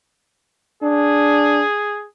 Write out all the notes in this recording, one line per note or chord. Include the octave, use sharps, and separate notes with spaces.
D4 G#4